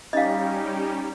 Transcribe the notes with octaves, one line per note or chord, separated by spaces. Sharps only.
G3 C#4 D#4 G4 D#5 F5